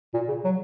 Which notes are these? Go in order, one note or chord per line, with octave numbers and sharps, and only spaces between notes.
A#2
C#3
F#3